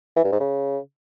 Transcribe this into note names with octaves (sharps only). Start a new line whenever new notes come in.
E3
G2
G#2
C#3